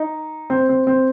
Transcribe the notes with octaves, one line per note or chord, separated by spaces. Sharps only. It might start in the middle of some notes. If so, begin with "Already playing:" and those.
Already playing: D#4
C4
C4
C4